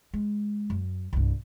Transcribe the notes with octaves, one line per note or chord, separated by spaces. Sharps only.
G#3
F#2
C2 G2